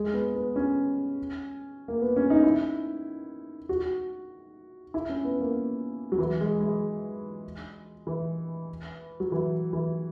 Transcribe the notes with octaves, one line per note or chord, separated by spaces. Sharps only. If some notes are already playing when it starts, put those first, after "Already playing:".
Already playing: G#3
B3
B3
C#4
A#3
B3
C#4
D#4
E4
F#4
E4
C#4
B3
A#3
F#3
E3
G#3
G#3
E3
F#3
E3
E3